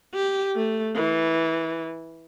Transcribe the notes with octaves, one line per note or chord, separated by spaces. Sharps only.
G4
A3
E3